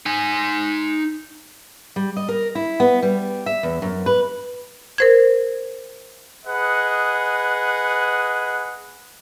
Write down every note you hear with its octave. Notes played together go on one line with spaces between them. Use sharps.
D#4 G#5
G3
D#5
A#4
E4
B3
G3
E5
E2
F#2
B4
A#4 C5 G#6
G#4 B4 D#5 F#5